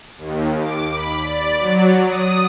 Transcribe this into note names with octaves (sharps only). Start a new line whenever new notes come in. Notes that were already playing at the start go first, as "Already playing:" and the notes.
D#2
D6
B5
D5
F#3
D#6